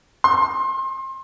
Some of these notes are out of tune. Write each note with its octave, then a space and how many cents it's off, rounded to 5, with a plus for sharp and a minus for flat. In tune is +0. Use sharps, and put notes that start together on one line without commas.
C6 +30